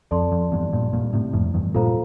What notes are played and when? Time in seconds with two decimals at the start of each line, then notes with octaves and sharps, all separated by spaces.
0.11 F2 A4 D5 A5 C6
0.32 F2
0.52 E2 G2
0.73 G2 A#2
0.93 G2 A#2
1.13 A2 C3
1.33 F2 A2
1.54 E2 G2
1.74 G2 A#2 F4 A4 C5 F5 A#5